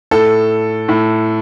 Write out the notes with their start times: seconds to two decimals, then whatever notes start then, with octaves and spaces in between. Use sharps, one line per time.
0.11 A2 A4
0.88 A2